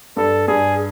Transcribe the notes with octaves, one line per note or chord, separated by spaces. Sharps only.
G2 A4
G2 G#4